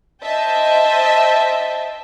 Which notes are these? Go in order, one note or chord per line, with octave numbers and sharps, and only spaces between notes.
C5 D#5 E5 G5 A5